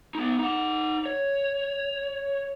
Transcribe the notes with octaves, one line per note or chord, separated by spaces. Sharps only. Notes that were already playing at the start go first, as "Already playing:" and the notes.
B3 D#4
D#4 F#5
C#5